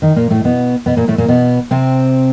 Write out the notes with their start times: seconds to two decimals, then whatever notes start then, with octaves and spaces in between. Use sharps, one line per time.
0.02 D#3 D#4
0.16 A#2 A#3
0.30 A2 A3
0.44 B2 B3
0.86 B2 B3
0.97 A#2 A#3
1.08 A2 A3
1.18 A#2 A#3
1.28 B2 B3
1.71 C3 C4